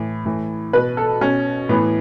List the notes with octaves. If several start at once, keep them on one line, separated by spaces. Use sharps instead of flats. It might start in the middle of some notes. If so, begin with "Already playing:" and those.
Already playing: A2 E3
A2 E3
B2 B4
A4
B2 C#4
A2 E3 B3